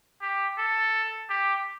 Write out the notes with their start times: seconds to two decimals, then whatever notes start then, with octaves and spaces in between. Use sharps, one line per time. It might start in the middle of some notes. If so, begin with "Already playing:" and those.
0.22 G4
0.58 A4
1.29 G4